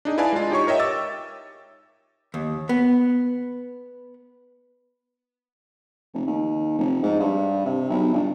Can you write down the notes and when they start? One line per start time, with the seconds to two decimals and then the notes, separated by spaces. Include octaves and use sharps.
0.05 D4 D#4 G#4
0.18 E4 B4 D5 F5 G#5 A5
0.32 G#3 F4
0.50 D#4 G4 C#5 C#6
0.67 A#4 C#5 D#5 E5 G5
0.80 D6 E6 A6
2.34 D#2
2.69 B3
6.14 F1
6.27 D#2
6.78 F1
7.03 G#2
7.20 G2
7.65 C3
7.90 B1
8.13 G1